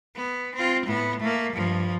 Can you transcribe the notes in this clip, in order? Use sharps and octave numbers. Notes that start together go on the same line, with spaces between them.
B3
C4 F4
A2 B3
A3 A#3
G2 F3